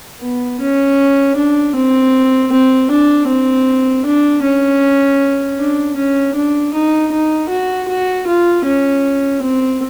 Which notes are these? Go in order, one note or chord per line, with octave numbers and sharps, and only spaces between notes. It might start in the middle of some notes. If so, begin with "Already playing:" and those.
B3
C#4
D4
C4
C4
D4
C4
D4
C#4
D4
C#4
D4
D#4
D#4
F#4
F#4
F4
C#4
C4